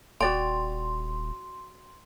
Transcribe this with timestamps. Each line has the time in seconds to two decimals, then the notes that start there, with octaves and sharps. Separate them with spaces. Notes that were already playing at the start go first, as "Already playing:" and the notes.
0.21 D#1 F#4 D5 G5 C6